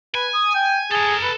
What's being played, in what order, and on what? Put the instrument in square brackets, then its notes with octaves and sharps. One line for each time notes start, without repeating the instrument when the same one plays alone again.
[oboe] B4 [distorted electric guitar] G#5
[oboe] D#6
G5
[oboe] G#4 [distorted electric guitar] A4 A#5
[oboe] B4